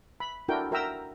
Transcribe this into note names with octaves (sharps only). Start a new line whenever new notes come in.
B5
D4 E4 F#4 A4 A#4 G5
F#4 A#4 E5 G5 A#5 E6